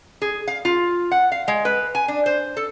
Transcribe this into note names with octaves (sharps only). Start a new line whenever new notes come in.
G#4
F5
F4
F#5
F5
G#3
B4
G#5
D4
C5
A4